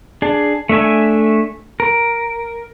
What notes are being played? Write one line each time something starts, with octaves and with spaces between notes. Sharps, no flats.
D4 G#4
A3 D4 E5 G#5
A#4